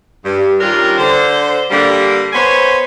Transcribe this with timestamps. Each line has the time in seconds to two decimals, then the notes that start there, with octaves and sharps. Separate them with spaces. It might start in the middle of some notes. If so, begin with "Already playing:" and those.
0.24 G2
0.60 D#3 G3 C#4 D4 F4 A#4
0.98 D3 C5
1.71 D3 G3 A#3
2.33 B3 C5 C#5 G#5 B5 C6